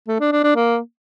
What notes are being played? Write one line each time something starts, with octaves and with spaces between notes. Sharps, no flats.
A3
D4
D4
D4
A#3